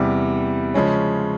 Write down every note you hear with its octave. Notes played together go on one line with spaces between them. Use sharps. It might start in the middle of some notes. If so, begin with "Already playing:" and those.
Already playing: E2 C3 G3
C#3 F3 G#3 C#4